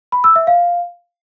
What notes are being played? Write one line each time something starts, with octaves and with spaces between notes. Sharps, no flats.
B5
E6
E5
F5